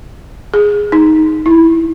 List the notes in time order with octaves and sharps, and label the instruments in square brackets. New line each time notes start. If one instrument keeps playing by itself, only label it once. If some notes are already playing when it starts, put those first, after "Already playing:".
[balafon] G#4
D#4
E4